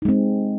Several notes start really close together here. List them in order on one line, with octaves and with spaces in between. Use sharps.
D#4 G#3 C4